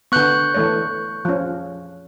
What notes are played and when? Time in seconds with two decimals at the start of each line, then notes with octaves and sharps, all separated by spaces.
0.12 D3 B3 C#6 F#6 G6
0.54 E3 A3 C#5
1.25 F3 C#4